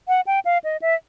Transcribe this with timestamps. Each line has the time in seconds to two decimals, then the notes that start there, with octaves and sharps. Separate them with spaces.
0.08 F#5
0.27 G5
0.45 F5
0.64 D#5
0.82 E5